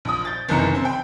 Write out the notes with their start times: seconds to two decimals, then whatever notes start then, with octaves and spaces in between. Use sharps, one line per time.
0.05 A#1 D#6
0.25 G6 A6
0.49 F#1 C2 D#3 E3 A#5 C#7
0.73 C#3 C4
0.85 G5 B5